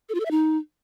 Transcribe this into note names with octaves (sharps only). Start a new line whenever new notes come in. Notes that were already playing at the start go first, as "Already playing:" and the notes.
A4
F4
A4
E5
D#4